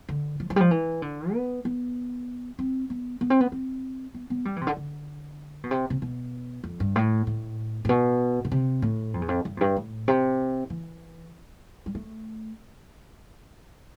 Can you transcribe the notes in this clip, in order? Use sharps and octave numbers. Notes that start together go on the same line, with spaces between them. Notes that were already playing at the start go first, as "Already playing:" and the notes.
D3
F3
F3
G3
F3
E3
D3
B3
B3
C4
B3
B3
C4
B3
C4
B3
B3
G3
E3
C3
D3
D3
B2
C3
C3
B2
F2
G2
A2
A2
A2
B2
B2
C3
A2
F2
E2
F2
G2
F2
G2
A2
C3
E3
G3
A3